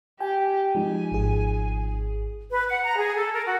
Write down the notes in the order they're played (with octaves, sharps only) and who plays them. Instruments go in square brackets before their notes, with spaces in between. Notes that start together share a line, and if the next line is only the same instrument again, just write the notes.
[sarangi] G4 [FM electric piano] G5 G#5
[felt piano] F3 D#4 [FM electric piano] G#3 [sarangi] G#5
[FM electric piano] G#1 G#4
[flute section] B4
F#5
A#5
G#4
A4
A#4
F#4